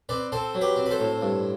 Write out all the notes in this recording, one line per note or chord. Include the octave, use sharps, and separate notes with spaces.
C4 B4 D5
C4 A4 C5
F#3
G4 B4
C4
B4
A4 C5
A2
G2